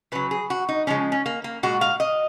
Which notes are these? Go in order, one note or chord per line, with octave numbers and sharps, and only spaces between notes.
C#3 F#3 B4
G#4
F#4
D#4
C#3 F3 G#3 C#4
C#4
A#3
A#3
A#2 G#3 F#4
F5
D#5